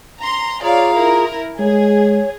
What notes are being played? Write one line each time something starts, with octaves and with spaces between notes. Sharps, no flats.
A#5 C6
F4 G#4 C#5 D5 F5 A#5
E4 A#4
G#3 G#4 C#5